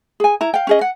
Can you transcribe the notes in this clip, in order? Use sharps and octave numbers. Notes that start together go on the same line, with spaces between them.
G#4 G#5
E4 A#5
F5 G5
C#4 G#4 D#5
F#5